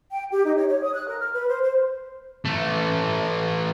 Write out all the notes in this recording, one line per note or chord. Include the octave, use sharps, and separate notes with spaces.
G5
G4
D#4
C#5
C#5
D#6
F#6
A#4
F6
B4
C5
C5
E3 A3